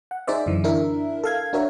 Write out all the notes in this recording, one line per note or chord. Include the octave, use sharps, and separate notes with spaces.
F#5
D#4 G#4 C5 D5 E5
F#2 D3 E3
D4 E4 A#4 E5
A4 F5 G#6
D4 F#4 A#4 C#5 E5